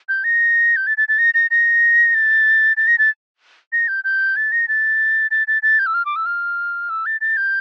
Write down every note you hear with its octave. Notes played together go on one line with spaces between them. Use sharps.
G6
A#6
G6
A6
A6
A6
A#6
A#6
A#6
A6
A6
A#6
A6
A#6
G6
G6
A6
A#6
A6
A6
A6
A6
G6
E6
F6
D6
E6
F6
E6
A6
A6
G6